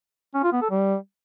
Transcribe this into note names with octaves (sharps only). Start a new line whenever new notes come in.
C#4
F4
B3
A4
G3